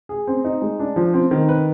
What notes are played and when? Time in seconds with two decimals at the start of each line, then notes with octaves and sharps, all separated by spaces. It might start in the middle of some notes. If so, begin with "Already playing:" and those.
0.09 G#4
0.27 C4
0.45 D#4
0.62 G#3
0.79 D4
0.96 F3
1.14 C4
1.31 D#3
1.49 B4